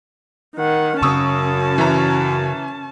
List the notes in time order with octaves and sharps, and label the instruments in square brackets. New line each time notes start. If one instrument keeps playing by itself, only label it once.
[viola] D#3 F#5
[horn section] F#2 [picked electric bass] C#3 [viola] C#4 A5 [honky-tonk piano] C#6 D#6 E6
[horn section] F#2 [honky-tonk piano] E3 E5 A#5